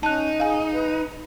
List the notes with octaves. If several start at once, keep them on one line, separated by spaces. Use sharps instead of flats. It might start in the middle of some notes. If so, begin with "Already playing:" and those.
C#4 D#4 A5 F#6
G#4 F5 G#5
B4